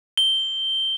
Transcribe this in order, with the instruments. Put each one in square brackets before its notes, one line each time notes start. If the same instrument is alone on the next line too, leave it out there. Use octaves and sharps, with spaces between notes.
[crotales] G7